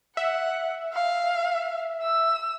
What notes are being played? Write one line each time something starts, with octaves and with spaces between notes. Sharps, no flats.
E5 F#5
F5
E6